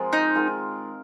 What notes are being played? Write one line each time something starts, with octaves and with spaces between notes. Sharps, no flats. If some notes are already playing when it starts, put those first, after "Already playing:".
Already playing: F3 G#3 C4 F4 A#4
D#4
D#3 G#3 F4 A#4